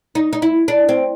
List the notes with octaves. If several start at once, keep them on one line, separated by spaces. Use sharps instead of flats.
D#4
D#4
E4
D4
C4